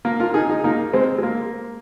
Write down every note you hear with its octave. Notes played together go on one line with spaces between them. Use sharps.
A#3
F4 A#4
D#4 G#4
D#4 G#4
A#3 D#4
G#3 C4
G#3
A#3